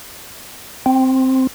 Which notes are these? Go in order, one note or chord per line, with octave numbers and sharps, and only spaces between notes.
C4